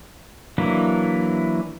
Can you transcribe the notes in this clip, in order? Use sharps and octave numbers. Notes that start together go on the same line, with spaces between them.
E3 F#3 A#3 D4 E4